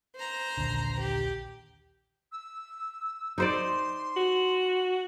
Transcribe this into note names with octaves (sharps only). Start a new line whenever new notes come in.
C5 A#5
A#1 D#2 D3
G4
E6
D#4 C5 D5 C6
F#4